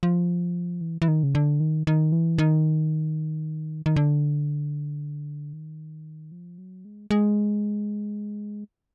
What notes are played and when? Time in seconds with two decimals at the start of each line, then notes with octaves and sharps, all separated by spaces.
0.03 F3
0.81 E3
1.02 E3
1.08 D#3
1.23 C#3
1.35 D3
1.60 D#3
1.87 D#3
2.12 E3
2.38 D#3
3.86 D#3
3.96 D3
5.53 D#3
6.32 F3
6.58 F#3
6.85 G#3
7.11 G#3